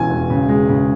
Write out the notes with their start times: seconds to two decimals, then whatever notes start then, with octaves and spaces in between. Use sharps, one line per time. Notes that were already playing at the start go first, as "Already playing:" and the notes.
Already playing: E1 E2 C#4 G#5
0.10 E1
0.30 C#3
0.49 G#3
0.69 C#3